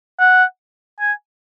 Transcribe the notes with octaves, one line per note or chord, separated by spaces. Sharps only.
F#5
G#5